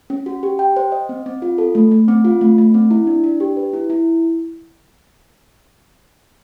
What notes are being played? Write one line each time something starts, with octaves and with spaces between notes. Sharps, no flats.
C#4
F#4
G4
G5
C5
D#5
C4
C4
F4
A4
A3
A3
C4
F4
A3
A3
C4
E4
D4
D4
G4
B4
E4
E4